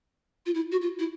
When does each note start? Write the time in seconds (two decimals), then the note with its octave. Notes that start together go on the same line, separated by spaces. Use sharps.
0.46 F4
0.55 E4
0.72 F#4
0.81 F4
0.99 E4